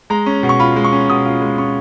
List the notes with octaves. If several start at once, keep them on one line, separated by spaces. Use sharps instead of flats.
G#3 A#5
C#4
B2
C#6
F4 B5
G#3
C#6
C#4
B2 D#6
F4
G#3
C#4 C#6